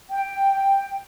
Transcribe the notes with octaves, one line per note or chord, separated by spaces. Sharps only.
G5